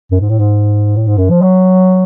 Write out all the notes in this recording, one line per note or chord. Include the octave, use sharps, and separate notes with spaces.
F#2
G#2
A2
G#2
A2
G#2
F#2
F3
F#3